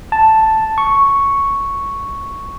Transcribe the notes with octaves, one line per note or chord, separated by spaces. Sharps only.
A5
C#6